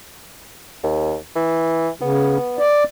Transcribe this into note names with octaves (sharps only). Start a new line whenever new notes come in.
D#2
E3
C#3 B3
D5